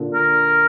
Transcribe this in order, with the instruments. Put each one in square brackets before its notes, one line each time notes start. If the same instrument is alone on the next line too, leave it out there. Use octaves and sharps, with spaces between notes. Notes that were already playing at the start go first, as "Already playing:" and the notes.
Already playing: [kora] A#2 D3
[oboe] A#4